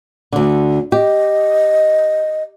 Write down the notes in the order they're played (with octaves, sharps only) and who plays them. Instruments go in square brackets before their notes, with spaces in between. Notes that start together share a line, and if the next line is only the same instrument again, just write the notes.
[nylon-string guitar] D2 D3
[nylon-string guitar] G4 [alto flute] D#5